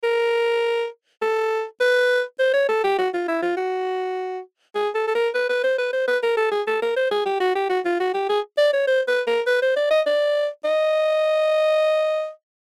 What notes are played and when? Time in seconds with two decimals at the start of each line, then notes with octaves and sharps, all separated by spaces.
0.04 A#4
1.22 A4
1.81 B4
2.39 C5
2.54 C#5
2.69 A4
2.84 G4
2.99 F#4
3.14 F4
3.29 E4
3.43 F4
3.57 F#4
4.75 G#4
4.95 A4
5.08 A4
5.15 A#4
5.35 B4
5.49 B4
5.64 C5
5.78 B4
5.93 C5
6.08 B4
6.23 A#4
6.37 A4
6.52 G#4
6.67 A4
6.82 A#4
6.97 C5
7.12 G#4
7.26 G4
7.41 F#4
7.56 G4
7.70 F#4
7.86 F4
8.00 F#4
8.14 G4
8.30 G#4
8.58 D5
8.73 C#5
8.88 C5
9.08 B4
9.28 A#4
9.47 B4
9.62 C5
9.76 D5
9.91 D#5
10.06 D5
10.65 D#5